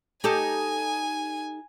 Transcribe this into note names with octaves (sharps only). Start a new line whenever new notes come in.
D#4 G4 A4 G#5